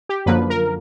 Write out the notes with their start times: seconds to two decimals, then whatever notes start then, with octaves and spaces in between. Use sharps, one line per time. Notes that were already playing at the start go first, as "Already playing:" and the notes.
0.09 G4
0.26 F#2 D3 F3 A#3 B4
0.50 A#4